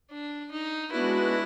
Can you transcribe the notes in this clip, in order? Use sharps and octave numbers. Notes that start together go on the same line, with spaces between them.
D4
D#4
G#3 B3 D4 E4 F#4 B4